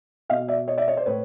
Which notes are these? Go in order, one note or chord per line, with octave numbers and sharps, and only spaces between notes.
B2 D#5 F5
D5 E5
C#5 D#5
D5 E5
C#5 D#5
C5 D5
A2 B4 C#5